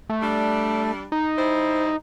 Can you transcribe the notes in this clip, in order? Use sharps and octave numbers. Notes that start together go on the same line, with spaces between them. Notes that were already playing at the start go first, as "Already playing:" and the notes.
A3
G3 D4
D#4
G3 E4 C5